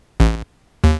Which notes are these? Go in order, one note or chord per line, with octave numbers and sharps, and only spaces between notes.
A1
D#2